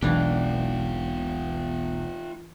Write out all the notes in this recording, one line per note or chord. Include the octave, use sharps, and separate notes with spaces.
E1 B1 E3 B3 D4 F4 G4